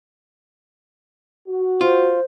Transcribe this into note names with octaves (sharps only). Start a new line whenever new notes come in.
F#4
F4 C5